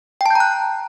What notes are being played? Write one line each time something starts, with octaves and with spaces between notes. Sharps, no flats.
G5 A5 A#5 F#6 G6